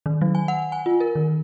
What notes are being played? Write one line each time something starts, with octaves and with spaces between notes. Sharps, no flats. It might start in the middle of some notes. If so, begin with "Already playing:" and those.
D#3
F#3
G#5
F#5
G#5
F4
A#4
D#3